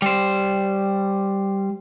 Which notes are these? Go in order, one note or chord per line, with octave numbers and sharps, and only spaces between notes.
G3 C5